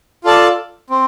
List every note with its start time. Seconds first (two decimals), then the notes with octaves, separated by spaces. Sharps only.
0.24 F4 A4 D5 A5
0.90 C4